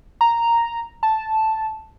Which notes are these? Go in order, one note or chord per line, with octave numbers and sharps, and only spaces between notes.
A#5
A5